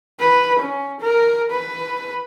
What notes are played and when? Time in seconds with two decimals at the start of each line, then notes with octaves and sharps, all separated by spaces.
0.20 B4
0.59 C#4
1.00 A#4
1.50 B4